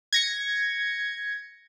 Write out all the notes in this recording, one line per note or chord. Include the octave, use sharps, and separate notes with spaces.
G#6 A#6 C#7